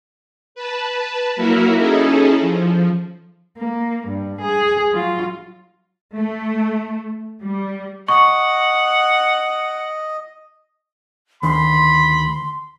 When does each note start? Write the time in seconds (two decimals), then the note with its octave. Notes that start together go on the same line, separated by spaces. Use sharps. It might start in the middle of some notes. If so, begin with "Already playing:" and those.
0.55 B4 A5
1.36 F#3 A#3 E4 F#4 A#4 E5
1.75 C#4 D#4 E4 G#4 A4
2.41 F3
3.58 A#3
4.08 G2
4.41 G#4
4.93 F#3 F4
6.17 A3
7.42 G3
8.08 D#5 F#5 C#6
11.43 D2 D#3 B5 C6